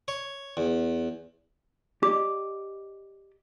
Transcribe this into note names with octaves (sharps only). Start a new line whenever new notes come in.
C#5
E2
G4 D5 D#5 D6